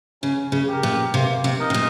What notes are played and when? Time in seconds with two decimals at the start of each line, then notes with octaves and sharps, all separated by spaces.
0.22 C#3 C#4
0.52 C#3
0.68 G4 A#4
0.83 A#2
1.14 C3 A#3
1.44 C3
1.59 D#4 A#4 D#5
1.70 C3
1.74 A#2